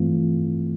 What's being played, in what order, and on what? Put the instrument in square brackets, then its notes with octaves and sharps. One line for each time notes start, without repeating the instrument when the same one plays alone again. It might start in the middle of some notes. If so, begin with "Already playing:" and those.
Already playing: [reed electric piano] G2 E3 A3 C4 F4